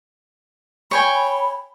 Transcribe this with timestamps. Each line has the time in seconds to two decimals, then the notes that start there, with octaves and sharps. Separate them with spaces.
0.91 C#5 G5 G#5 B5